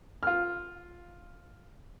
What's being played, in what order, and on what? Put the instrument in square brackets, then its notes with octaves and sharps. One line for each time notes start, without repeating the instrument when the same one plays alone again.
[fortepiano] F4 F6